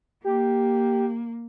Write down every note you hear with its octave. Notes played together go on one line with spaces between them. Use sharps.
A#3 G4